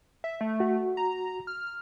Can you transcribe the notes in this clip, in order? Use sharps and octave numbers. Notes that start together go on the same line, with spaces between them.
E5
A3
F#4
A#5
F6